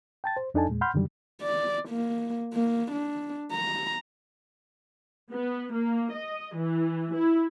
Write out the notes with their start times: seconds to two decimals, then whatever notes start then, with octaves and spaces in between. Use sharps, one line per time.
0.24 G5 A5 A6
0.37 C5
0.54 F2 D4 D#4 A4 G#5 A5
0.69 E2 A#2 G#3
0.81 F#5 B5 C6 F6 G6
0.94 F#2 D3 D#3 F#3 G3
1.42 D5
1.89 A#3
2.54 A#3
2.92 D4
3.51 A#5
5.31 B3
5.72 A#3
6.12 D#5
6.55 E3
7.13 E4